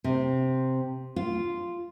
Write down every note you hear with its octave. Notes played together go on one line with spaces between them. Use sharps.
C3
F4